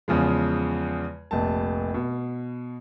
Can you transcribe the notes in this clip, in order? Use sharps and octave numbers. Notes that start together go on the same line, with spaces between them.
E2 C#3 F3 G#3
F1 A#1 A5
B2